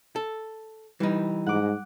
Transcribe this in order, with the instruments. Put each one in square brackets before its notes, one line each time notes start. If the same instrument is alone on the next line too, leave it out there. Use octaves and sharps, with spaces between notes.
[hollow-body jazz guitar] A4
[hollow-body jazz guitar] E3 D#4 [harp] G3
[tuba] G#2 [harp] F#5 D6